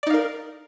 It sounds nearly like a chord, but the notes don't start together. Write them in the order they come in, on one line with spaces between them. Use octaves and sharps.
D5 D#4 F5 A#4